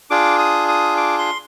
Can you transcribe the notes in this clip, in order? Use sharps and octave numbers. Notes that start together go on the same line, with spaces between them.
D4 F4 G#4 D6
D#6
D#6
D6
C6